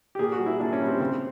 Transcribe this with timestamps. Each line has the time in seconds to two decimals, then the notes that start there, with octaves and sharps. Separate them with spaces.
0.15 G4
0.19 A#2 G#4
0.32 F#4
0.40 G3
0.46 E4
0.60 A#2 D4
0.73 C#4
0.80 G3
0.87 C4
1.00 C#3 C4